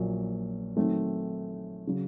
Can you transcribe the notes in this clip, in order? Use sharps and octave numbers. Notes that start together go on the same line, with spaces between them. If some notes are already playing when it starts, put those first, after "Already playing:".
Already playing: A#1 A#2 F#3 A#3
D#3 F#3 A3 C4
C#3 F#3